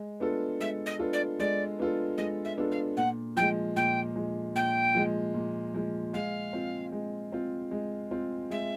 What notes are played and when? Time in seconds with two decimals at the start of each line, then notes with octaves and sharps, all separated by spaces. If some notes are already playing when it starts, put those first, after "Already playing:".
Already playing: G#3
0.20 B3 D4 F4 A4
0.60 G#3 E5
0.86 D#5
0.99 B3 D4 F4 A4
1.13 D5
1.39 G#3 D5
1.79 B3 D4 F4 A4
2.17 G#3 D#5
2.44 E5
2.57 B3 D4 F4 A4
2.71 F5
2.97 A#2 F#5
3.36 F3 G#3 G5
3.76 A#2 G5
4.16 F3 G#3
4.55 A#2 G5
4.95 F3 G#3
5.34 A#2
5.74 F3 G#3
6.13 G#3 F5
6.53 C4 F4
6.92 G#3
7.32 C4 F4
7.71 G#3
8.11 C4 F4
8.51 G#3 E5